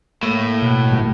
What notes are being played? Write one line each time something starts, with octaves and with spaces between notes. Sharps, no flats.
A2 A#3
B2 E4 F#4
G1 G3 A#3